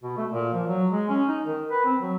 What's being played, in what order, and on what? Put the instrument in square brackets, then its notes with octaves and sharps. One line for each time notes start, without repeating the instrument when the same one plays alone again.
[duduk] B2
A3
A#2
F3
F#3
G#3
C#4
D#4
D#3
B4
C4
F#3